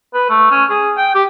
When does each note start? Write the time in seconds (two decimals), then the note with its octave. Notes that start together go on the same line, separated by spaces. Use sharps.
0.14 B4
0.30 A3
0.51 C#4
0.70 G#4
0.97 G5
1.15 G4